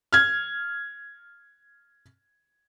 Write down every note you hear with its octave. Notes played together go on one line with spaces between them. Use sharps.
F6 G#6